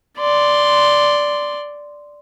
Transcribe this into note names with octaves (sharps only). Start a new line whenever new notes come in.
D5 C6